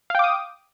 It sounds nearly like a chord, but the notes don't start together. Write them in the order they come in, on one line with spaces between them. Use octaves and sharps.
F5 G5 D6 D#6